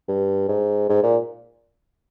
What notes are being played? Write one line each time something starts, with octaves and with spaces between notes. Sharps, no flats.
G2
G#2
G#2
A#2